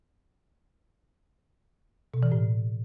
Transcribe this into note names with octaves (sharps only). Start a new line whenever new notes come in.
B2
E3
A2